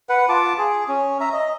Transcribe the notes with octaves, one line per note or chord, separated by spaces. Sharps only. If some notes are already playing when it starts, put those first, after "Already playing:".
B4 F#5
F4 A5 D6
G#4
C#4
E5 A#5
D#5